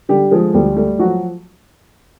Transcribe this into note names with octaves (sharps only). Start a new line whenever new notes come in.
D3 G3 G4
F3 G#3 G#4
D2 G3 G4
G3 A3 G4
F3 F#3 F#4